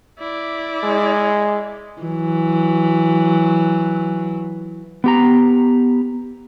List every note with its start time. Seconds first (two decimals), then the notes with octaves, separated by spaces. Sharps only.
0.19 E4 D5
0.83 G#3
2.02 E3 F#3
5.04 B3 G4 A#5